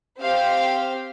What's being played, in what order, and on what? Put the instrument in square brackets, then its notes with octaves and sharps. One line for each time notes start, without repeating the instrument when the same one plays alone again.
[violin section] C4 G4 C5 F5